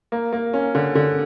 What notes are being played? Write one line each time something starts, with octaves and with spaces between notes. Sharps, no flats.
A#3
A#3
C#4
D3
D3